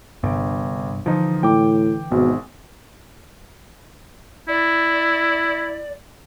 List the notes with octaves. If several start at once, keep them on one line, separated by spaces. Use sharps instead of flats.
G1 G2 C3 G3
D3 E3 F3 D#4
A2 G5 D6
G#1 G#2 B2
E4 D5